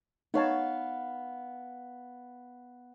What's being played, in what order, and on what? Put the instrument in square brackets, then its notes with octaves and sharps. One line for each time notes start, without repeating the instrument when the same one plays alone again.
[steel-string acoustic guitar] B3 F5 [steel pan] D#4 C#5 A5